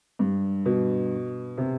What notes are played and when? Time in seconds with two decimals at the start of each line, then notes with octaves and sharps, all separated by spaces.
0.19 G2
0.66 B2
1.58 C3